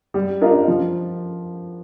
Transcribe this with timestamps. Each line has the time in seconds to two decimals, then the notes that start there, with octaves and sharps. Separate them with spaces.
0.14 G3
0.41 D4 F4 A#4 D#5
0.68 F3